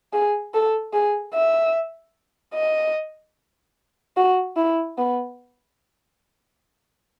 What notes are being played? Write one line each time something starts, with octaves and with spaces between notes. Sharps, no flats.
G#4
A4
G#4
E5
D#5
F#4
E4
B3